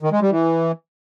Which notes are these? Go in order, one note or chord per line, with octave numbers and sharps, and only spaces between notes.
D#3
G#3
G3
E3